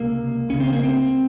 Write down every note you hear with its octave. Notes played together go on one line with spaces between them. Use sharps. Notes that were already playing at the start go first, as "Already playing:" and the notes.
Already playing: C#2 C3 A#3
C#2 C#3 C#4
C4
A#3
C4